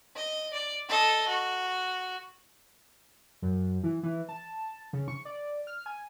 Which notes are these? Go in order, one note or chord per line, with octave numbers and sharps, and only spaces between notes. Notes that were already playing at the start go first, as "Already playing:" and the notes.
D#5
D5
A4 D#5
F#4
F#2
E3
E3
A5
C#3
C#6
D5
F6
G#5